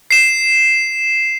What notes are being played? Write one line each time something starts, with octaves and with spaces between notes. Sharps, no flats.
C7 E7